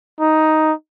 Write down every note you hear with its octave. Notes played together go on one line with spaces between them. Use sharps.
D#4